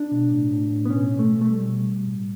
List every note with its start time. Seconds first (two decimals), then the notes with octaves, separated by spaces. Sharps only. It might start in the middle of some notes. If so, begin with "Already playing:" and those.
Already playing: D4
0.12 B2
0.31 A2
0.51 A2
0.70 A2
0.85 B3
0.89 B2 C#4
1.10 B2
1.19 A3
1.30 B2
1.41 A3
1.49 B2 G3
1.69 B2
1.88 B2
2.08 A2